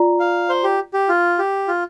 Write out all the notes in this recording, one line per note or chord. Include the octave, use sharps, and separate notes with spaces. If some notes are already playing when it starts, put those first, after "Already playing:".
Already playing: F4 D5 A#5
F5
C5
G4
G4
F4
G4
F4